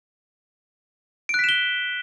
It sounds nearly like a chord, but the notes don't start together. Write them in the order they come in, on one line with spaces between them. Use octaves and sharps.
D7 F#6 B6 E7 G7